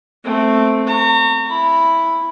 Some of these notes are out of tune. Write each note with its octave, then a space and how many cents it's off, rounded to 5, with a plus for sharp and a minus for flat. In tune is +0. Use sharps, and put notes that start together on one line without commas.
A3 +0 C4 +0
A#5 -35 C#6 +5
E4 +0 B5 +0